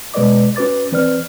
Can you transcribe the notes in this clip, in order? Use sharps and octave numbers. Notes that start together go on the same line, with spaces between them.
B2 G#3 B4 D5 D#5 D6
C#4 F#4 B4 D6 A6
E3 C4 B4 D5 F6